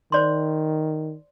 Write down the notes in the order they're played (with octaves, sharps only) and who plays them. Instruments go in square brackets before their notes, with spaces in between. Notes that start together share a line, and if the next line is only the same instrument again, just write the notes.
[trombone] D#3 [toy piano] C5 D5 C6